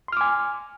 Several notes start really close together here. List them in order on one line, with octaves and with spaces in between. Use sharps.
C6 F6 D6 G#5